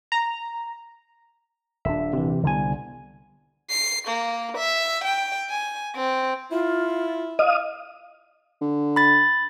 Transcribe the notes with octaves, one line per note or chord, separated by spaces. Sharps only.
A#5
D#1 D4 E5
C3 E3
C2 D3 B3 G#5
C7
A#3
E5
G5
G#5
C4
E4 F4
D#5 F5 D#6
D3
B5 A6